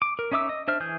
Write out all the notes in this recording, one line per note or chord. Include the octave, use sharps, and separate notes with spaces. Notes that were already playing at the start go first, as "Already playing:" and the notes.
D6
A#4
C#4 D#4 E5 D6 E6
D#5
D4 C5 E5 F6
E3 G#4 G6